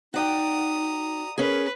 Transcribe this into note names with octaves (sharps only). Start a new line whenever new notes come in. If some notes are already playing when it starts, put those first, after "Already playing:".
D#4 F#4 D5 G5 A#5 D#6
C#4 G#4 A#4 B4